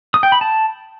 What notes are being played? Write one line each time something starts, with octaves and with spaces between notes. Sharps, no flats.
D#6
G5
B5
A5